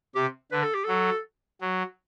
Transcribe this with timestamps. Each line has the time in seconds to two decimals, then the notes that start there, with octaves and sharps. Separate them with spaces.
0.15 C3 G4
0.52 D3 B4
0.63 A4
0.75 G4
0.85 F#3 A4
1.61 F#3